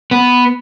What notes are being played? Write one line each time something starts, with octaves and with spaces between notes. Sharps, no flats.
B3